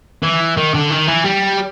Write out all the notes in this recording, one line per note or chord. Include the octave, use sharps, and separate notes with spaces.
E3
D#3
D3
D#3
E3
G3